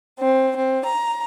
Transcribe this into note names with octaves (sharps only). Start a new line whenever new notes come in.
C4
C4
A#5